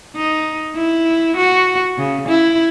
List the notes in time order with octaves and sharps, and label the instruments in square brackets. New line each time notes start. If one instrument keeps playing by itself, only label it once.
[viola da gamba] D#4
E4
F#4
C#3
E4